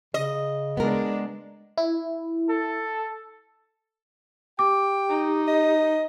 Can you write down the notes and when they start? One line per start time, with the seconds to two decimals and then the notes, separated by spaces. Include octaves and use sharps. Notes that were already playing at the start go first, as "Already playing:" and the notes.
0.14 C#3 D#5
0.77 G#3 B3 D4 A#4
1.78 E4
2.49 A4
4.59 G4 G5 D6
5.09 D#4
5.48 D#5